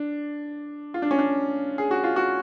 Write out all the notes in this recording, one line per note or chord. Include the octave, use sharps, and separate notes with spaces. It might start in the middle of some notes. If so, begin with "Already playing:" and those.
Already playing: D4
F4
D4
C#4
D4
G#4
F#4
F4
F#4